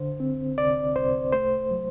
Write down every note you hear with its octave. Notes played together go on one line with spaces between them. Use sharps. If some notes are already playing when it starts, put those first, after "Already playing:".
Already playing: D3 C5
C4
C2 D5
C2 C5
A3 C5
F#3